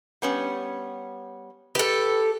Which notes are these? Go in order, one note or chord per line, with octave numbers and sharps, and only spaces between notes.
G3 B3 C#4
G4 A4 B4